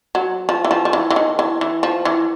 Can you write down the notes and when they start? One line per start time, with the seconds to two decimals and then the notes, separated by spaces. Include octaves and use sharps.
0.15 F#3
0.49 F3
0.65 E3
0.71 F3
0.85 F3
0.93 E3
1.10 E3
1.16 D#3
1.39 E3
1.61 E3
1.83 F3
2.05 E3